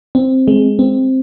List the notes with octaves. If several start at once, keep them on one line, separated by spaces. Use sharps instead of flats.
C4
G#3
C4